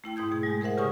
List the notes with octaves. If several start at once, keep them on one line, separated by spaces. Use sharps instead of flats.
A3 E4 G5
G#2 E4 D#6 G6 G#6
B2 G#4
G3 G#3
G#4 A#4 C5 E5 F#5
C#3 G4 G#5 C#6 D#6